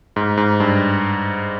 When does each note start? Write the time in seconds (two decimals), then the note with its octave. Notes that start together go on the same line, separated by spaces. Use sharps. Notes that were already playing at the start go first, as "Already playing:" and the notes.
0.16 G#2
0.37 G#2
0.60 G2